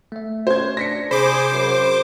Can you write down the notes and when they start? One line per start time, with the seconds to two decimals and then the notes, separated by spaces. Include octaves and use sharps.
0.12 A3 E5
0.47 C#4 C5 G#6
0.77 D4 A#6 B6 C#7
1.11 C3 G#4 C5 B5 D6
1.52 F#2